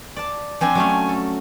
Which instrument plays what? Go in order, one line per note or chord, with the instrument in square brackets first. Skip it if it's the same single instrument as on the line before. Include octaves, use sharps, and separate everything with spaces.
[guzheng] D5 A5
[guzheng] F3 C4 D4 [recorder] G#5
[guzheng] F#3 A3 C#4
A4